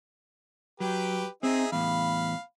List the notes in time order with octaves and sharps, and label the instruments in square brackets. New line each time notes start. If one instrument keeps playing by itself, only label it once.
[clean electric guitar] F#3 [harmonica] G4 B4 G5
[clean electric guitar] C4 [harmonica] D#4 G#4 E5
[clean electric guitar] E2 A2 [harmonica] F5 B5